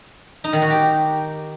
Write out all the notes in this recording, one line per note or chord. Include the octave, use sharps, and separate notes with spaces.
D#4
D#3
F#4
G4